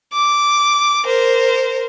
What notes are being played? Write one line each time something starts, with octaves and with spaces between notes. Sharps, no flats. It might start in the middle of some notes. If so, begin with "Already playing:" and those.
D6
A#4 C5